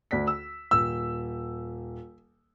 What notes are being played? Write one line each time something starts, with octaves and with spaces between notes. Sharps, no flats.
D2 D5 B6
E6
D#1 E6